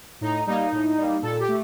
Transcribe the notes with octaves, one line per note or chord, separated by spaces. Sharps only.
A2 D#4
G3 A#3 D#4
A2
G3 A#3
A#2 A4
G4
A3